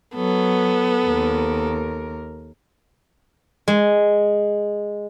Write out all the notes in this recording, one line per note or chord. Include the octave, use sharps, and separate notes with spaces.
F#3 B3 A4
D#2 A#4
G#3